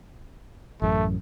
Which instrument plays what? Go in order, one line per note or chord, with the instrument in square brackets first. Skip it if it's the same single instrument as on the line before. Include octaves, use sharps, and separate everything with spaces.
[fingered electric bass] A1 F#2 [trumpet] A3